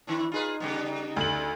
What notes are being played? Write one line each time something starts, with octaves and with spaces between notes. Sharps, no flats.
D#3 C4 D4 E4
D#4 F4 G#4 B4
C#3 G3 B3
D2 F#7